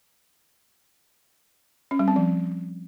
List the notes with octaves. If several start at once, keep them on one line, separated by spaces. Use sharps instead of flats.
C#4
G3
C4
F3